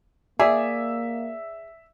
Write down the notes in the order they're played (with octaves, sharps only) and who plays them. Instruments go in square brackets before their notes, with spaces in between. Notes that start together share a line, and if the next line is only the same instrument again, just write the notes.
[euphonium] A#3 [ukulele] G#4 [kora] D5 [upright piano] E5